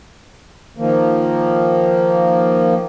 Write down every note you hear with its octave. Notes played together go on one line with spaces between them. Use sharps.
D#3 F3 A#3